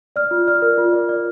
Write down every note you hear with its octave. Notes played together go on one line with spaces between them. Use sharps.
D5 F6
F4
D5 F6
A#4
F4
D5
D5